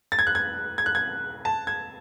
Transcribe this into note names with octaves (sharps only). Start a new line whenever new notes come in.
A6
G#6
F#6
G#6
G#6
F#6
G#6
A5
G#6